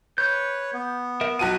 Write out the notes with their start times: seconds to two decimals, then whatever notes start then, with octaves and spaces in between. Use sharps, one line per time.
0.18 B4 C#5 G6
0.74 B3
1.21 A#4 E5
1.39 B1 F#4 F5 D#7